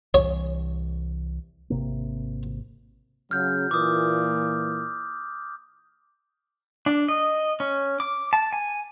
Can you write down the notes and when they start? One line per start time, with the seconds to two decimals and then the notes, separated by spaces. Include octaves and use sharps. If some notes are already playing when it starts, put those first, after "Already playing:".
0.14 C2 E3 C#5
1.70 G#1 C3 A#3
3.31 C#3 F#3 F6 G6
3.71 A#2 E3 D6 D#6
6.86 D4
7.08 D#5
7.60 C#4
8.00 D6
8.33 A5
8.53 G#5